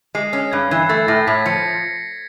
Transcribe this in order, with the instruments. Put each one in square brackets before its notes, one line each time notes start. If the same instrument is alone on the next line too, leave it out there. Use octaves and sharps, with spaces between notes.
[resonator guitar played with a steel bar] G#3 [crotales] C7
[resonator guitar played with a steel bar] C#4
[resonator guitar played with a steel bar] G2 [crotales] G#6
[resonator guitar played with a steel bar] E3 [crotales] G#6
[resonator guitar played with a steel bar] A3 [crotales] A6
[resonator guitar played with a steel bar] A2 [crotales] A#6
[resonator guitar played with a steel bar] A2 [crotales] B6
[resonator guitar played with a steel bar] F3 [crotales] C#7